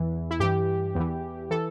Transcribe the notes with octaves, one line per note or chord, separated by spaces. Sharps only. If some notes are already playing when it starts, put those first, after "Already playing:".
Already playing: E2 E3
E4
G2 E3 G4
E2 E3
E3 A4